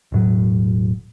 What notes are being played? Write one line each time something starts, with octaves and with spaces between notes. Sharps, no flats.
E1 A2 F#3